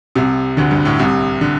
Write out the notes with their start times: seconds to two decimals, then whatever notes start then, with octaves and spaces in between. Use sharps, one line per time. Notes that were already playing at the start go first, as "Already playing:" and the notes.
0.15 C2 C3
0.57 D2 D3
0.71 G2
0.85 A2
0.99 C2 C3
1.41 D3